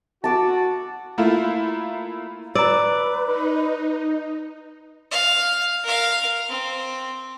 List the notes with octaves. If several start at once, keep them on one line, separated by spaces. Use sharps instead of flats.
F#4 A5 D6 E6
A3 A#3 E4 F4
B4 D5 A#5 E6
D#4
F5
A#4 F5
C4